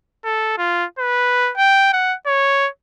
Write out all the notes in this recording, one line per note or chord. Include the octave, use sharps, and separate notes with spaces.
A4
F4
B4
G5
F#5
C#5